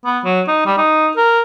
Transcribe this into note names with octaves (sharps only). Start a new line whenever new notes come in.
B3
F#3
D#4
G3
D#4
A#4